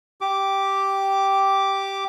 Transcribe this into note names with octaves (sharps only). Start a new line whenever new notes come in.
G4 D6